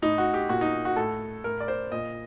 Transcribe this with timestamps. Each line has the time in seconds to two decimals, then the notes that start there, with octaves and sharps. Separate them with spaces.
0.02 A2 D#4
0.18 F#4
0.34 G4
0.49 A#2 F#4
0.61 D#4
0.85 F#4
0.96 A2 A4
1.44 A2 A#4
1.60 D5
1.68 C5
1.92 A#2 D#5